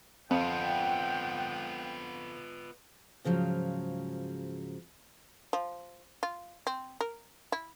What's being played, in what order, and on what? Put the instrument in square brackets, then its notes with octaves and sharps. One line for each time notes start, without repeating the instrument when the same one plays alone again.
[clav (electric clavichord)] F2 [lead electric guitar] B3 F4 [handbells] C4 [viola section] F#5 G5
[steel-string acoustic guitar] G#2 C#3 F3 F#3
[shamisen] F3
F4
C4
A#4
E4